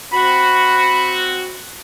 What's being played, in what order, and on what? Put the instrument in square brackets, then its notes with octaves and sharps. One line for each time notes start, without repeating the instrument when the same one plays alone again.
[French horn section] C4 F#4 [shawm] B5